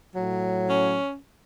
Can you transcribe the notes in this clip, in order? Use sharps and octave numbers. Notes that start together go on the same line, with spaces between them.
A2 F#3
C#4